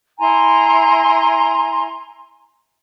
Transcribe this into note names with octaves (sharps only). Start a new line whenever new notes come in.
E4 G#5 A#5 C6